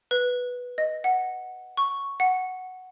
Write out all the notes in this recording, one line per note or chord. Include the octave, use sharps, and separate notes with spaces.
B4
D#5
F#5
C#6
F#5